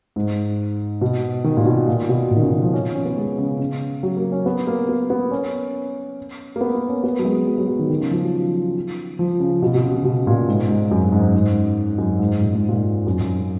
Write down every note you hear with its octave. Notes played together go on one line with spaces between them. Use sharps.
G#2
B2
D#3
A#2
B2
A#2
B2
A#2
D#3
C#3
D#3
F3
C#4
C#4
B3
G#3
C#3
C#3
F#3
A#3
C#4
B3
A#3
B3
B3
C#4
A#3
B3
A#3
C#4
B3
F#3
G#3
F#3
F#3
F#3
D#3
D#3
C#3
F3
F#3
F3
C#3
B2
B2
C#3
C#3
B2
A#2
G#2
G#2
F#2
G#2
G#2
F#2
G#2
A#2
G#2
A#2
F#2
F#2